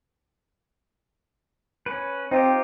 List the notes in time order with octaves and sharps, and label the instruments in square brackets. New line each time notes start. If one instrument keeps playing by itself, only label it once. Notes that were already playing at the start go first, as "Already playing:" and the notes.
[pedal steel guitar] C#4 B4
[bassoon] C4 [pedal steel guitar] D#4 F4 G4